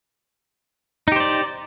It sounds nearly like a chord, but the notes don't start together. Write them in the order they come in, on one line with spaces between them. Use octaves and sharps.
D#4 G4 C5 D5